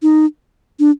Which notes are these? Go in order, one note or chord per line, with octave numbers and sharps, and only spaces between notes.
D#4
D4